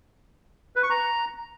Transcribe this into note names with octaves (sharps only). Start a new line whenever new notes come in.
B4
C#6
A#5